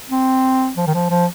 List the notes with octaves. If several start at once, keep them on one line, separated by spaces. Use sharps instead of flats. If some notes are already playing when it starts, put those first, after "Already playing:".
C4
F3
D#3
F3
F3